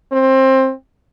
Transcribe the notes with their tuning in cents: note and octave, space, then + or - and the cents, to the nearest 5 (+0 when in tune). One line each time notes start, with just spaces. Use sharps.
C4 +20